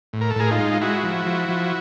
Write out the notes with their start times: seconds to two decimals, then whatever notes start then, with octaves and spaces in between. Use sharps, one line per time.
0.13 A2
0.21 A#4
0.31 A4
0.36 A2 G#4 A#4
0.51 D#4 F4
0.58 G#3
0.81 G#3 E4 F#4
1.04 F3
1.26 F3
1.49 F3